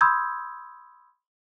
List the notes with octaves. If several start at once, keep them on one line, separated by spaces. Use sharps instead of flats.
B5 C6 D#6 E6 G6 G#6